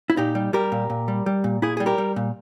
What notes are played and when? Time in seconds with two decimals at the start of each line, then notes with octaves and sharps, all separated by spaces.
0.10 E4
0.17 A#2 D#4 G4
0.35 G3
0.53 G3 G4 A#4
0.72 A#2
0.90 A#2
1.08 G3
1.26 G3
1.44 A#2
1.62 A#2 E4 G#4
1.77 G3 G#4
1.86 G4 A#4
1.98 G3
2.16 A#2